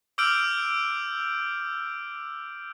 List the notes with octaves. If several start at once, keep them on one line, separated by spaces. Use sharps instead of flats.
D6 E6 F6 G6 D7 F#7